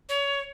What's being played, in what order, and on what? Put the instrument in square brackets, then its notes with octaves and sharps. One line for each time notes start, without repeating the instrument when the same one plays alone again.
[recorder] C#5